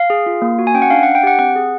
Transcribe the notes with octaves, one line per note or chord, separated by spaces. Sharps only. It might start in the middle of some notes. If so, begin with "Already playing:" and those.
Already playing: F5
G#4
F4
A#3
F#4
G#5
C#4 G5
F#5
D4 F5
F#5
D4
G5
G4 F#5
C4 F#5
G#4